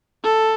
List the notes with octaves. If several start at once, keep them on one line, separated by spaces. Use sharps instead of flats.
A4